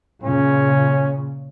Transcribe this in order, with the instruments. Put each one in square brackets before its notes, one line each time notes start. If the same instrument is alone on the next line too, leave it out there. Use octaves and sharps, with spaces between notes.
[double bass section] A#2 C#3 [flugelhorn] C#4